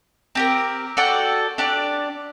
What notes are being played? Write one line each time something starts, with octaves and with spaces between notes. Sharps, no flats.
C4 G4 A#4
F#4 A4 D5 G5
D4 G4 D5